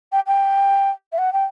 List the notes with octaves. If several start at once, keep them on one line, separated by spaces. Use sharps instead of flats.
G5
G5
E5
F#5
G5